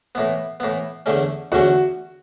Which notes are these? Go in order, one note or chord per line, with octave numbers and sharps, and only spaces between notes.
A2 E3 B3
A2 E3 B3
E2 D3 A3 C#4
E2 D3 A3 C#4 F#4